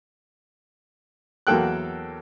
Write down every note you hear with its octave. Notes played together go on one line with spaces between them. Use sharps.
E2 F#3 A#3 A4 G5 F#6